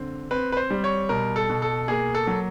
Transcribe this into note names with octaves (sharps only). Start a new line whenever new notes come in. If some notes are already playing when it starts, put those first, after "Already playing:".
Already playing: D3 C4
C4 B4
B4
C5
G3
C#5
B2 A#4
A4
B2
A4
A#3 G#4
A4
F#3